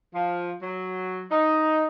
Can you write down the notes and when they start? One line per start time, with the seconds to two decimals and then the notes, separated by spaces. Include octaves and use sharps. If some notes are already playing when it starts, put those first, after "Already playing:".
0.14 F3
0.61 F#3
1.31 D#4